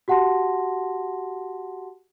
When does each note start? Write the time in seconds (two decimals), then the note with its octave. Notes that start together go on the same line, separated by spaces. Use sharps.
0.08 F#4 G4 F#5 A5 C6 A#6